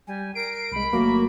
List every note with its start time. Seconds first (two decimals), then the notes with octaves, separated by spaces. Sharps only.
0.07 G3 G#5
0.35 A#4 C7 D7
0.72 C2 G#3 B5
0.93 G1 F#3 A3 A#3 F#4